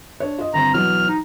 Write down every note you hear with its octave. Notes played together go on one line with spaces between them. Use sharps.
D4 C#5
F4 D#5
G1 C4 A#5
B2 E3 F#3 F6
D#4